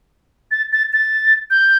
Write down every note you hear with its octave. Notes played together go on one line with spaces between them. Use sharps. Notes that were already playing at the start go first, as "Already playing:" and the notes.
A6
A6
A6
G6